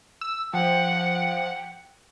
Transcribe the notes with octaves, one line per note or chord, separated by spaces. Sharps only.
E6
F3 F#5 G5